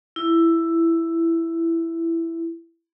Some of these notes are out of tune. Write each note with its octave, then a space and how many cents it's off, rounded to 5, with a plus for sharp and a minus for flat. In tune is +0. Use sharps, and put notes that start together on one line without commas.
E4 +10